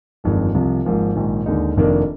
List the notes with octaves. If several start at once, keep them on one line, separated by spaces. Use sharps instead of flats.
G1 F2 D#3 G#3 D4
C2 C3 F3
G#1 G#2 F3 A#3
A#1 G#2 D#3
D#2 D3 G#3 D#4
F1 F2 D#3 A#3 D4